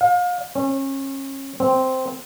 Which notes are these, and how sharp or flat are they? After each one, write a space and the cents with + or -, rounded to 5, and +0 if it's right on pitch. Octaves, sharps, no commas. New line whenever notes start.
F5 +35
C#4 -30
C4 -5